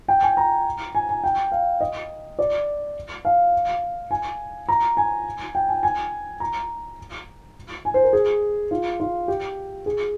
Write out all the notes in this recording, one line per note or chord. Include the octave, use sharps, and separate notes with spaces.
G5
G#5
A#5
G#5
G#5
G5
F5
D#5
D5
F5
G#5
A#5
G#5
G5
G#5
G#5
A#5
G#5
C5
A#4
G#4
F4
F4
G4
G#4